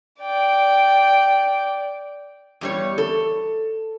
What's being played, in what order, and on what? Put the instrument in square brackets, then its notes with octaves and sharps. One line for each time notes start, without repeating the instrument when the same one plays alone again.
[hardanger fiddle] D5 G5
[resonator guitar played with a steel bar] E2 G3 C#5
A4